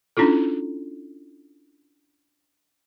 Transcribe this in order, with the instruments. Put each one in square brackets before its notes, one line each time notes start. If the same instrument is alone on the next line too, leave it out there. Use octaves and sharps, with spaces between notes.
[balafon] C#4 D4 E4 F4 A4